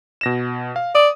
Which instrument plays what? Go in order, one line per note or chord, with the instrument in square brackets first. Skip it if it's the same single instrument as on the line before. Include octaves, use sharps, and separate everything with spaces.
[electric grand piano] B2 A#6 E7
F5
[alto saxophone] D5 [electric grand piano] D#6